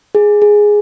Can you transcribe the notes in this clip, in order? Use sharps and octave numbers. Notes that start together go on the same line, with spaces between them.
G#4
G#4